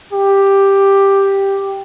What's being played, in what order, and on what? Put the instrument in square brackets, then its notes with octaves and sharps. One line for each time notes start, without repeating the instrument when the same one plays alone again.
[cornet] G4